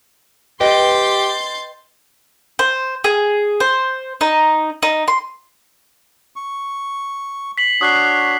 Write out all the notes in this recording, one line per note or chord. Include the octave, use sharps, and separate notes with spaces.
G4 B4 D#5 G5 C6 G6 A6
C5
G#4
C5
D#4
D#4
C6
C#6
B6 C7 F#7
D4 F#4 C#5 D#6 F#6 C7